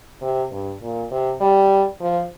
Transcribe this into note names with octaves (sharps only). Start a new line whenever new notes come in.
C3
G2
A#2
C3
G3
F3